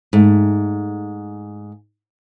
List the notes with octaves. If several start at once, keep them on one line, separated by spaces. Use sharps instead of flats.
G#2 A3